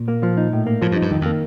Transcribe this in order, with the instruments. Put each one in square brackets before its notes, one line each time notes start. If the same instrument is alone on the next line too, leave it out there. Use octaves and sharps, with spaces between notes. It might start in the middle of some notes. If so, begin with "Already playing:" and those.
Already playing: [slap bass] A#2
[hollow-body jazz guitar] A#3
F3
D#4
A2
A#3
[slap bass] A2 [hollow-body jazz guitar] F3
[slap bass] G2
[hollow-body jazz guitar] D#4
[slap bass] G2
[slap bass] F2 [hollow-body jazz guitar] D#3
[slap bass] F2
[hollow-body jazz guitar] A#3